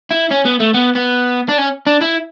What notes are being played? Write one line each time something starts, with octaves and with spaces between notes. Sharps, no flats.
E4
C#4
B3
A3
B3
B3
D4
C#4
D4
E4